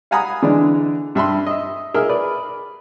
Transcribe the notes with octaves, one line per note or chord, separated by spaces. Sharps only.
F5 F#5 G#5 A#5 B5 D#6
D3 E3 G#3 D4
G2 E5 B5 C6
D#5 E5
G#4 A#4 D#5 E5 F6
B4 D5